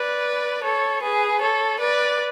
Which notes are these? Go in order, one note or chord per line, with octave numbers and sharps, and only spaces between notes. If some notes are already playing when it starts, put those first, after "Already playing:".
Already playing: B4 D5
A4 C#5
G#4 B4
A4 C#5
B4 D5